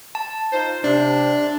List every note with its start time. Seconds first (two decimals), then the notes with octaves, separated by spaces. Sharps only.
0.15 A5
0.53 D#4 F4 C5
0.84 C3 D4